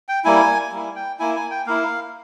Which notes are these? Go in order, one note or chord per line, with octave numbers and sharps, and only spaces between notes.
G5
G3 A#3 E4 G#5
G3 A#3 E4
G5
A#3 E4 G#5
G#5
G5
A#3 E4 F5